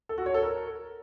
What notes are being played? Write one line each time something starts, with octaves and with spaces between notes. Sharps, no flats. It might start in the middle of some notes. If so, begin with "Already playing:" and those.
A4
F#4
C#5
A4
A#4